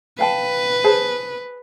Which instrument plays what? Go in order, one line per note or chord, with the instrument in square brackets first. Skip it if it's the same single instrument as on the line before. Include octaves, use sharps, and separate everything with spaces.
[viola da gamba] B4 [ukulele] F5 G5 A5
[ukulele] G#4 C5 A5